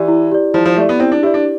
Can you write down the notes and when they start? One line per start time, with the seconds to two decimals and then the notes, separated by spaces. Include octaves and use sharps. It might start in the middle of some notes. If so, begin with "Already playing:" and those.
Already playing: E3 G4 D5
0.08 E4
0.32 G4 D5
0.54 F3 E4
0.66 F3
0.76 A3 G4 D5
0.89 B3
1.00 C4 E4
1.12 D4
1.23 E4 G4 D5
1.34 D4